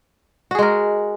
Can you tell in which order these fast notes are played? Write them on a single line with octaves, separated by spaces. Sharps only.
F#4 G#4 G#3 A#4